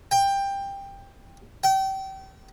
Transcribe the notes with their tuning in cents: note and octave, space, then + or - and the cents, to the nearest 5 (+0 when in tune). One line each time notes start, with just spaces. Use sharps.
G5 +15
G5 -30